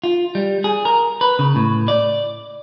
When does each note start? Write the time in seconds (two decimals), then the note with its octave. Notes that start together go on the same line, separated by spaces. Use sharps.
0.04 F4
0.35 G3
0.64 G#4
0.85 A#4
1.21 B4
1.39 C#3
1.56 A2
1.88 D5